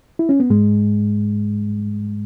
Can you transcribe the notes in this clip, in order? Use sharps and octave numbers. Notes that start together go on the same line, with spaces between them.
E4
C#4
B3
G#2 G#3